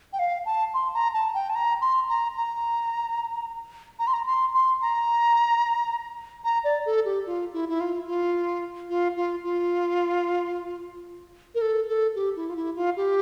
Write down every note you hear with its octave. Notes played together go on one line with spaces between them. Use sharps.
G5
F5
A5
C6
A#5
A5
G5
A5
A#5
C6
A#5
A#5
A#5
C6
A#5
C6
C6
A#5
A#5
D5
A4
G4
F4
E4
E4
F4
F4
F4
F4
F4
A#4
A4
A4
G4
E4
F4
E4
F4
G4